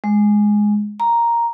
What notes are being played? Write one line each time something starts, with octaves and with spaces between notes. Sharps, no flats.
G#3
A#5